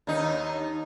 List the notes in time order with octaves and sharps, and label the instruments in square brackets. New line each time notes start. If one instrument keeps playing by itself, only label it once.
[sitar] D#2 D#4